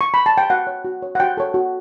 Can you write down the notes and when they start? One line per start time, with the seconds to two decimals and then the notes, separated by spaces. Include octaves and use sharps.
0.01 C#6
0.14 B5
0.26 A5
0.38 G5
0.50 F#4 F#5
0.67 C#5
0.85 F#4
1.02 C#5
1.15 F#5
1.20 F#4 G5
1.37 A4 C#5
1.54 F#4